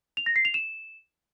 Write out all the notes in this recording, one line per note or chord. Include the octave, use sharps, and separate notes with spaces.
F7
A#6
C7
F7
E7